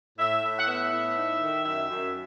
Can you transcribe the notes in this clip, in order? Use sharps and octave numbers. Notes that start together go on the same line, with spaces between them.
A2 E5
A2
F#5
B3 E5
A2
D#4
D#3
F#2 E5
F#2